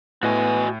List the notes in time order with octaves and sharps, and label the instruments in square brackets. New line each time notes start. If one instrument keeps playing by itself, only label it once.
[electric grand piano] A2 [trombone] B3 [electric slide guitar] F#4 D#5 G#5